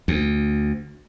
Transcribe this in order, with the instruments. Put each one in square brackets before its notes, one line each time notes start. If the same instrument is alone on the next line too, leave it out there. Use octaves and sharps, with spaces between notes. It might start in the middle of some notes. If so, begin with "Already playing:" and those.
[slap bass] D2